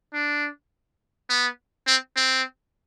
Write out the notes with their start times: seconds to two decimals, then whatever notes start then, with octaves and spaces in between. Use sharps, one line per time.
0.13 D4
1.30 B3
1.87 C4
2.16 C4